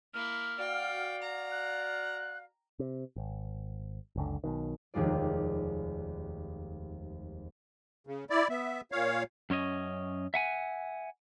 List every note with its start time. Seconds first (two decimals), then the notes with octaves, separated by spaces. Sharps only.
0.14 A#3 E4 F6
0.59 F#4 D5 F5 G5
1.22 A#5
1.51 F#6
2.79 C3
3.16 G#1
4.16 F#1 C#2 D3
4.44 B1 B2 D#3
4.94 F1 D#2 G#3 F4 D5
8.07 C#3
8.30 E4 D5
8.50 B3 E5
8.92 A#2 C#5 F5
9.50 F#2 C#4 C#5 D#5
10.34 E5 F#5 G#5